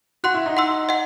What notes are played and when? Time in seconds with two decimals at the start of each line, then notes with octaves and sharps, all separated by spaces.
0.24 F#4 F#5 C6 F#6
0.34 E4
0.46 D#4
0.57 F#5 C6 E6
0.89 D#5 F#5